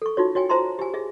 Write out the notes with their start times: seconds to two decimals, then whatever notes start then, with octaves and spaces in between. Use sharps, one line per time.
0.02 A4 C#6
0.17 D#4 F4 F#4 C#5
0.35 F#4 C#5 G5 G#5
0.50 F4 C5 E5 A5 A#5 C6
0.79 G4 G#5
0.94 G#4 E5